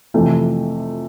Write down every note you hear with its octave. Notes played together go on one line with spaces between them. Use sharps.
F2 C3 E3 A3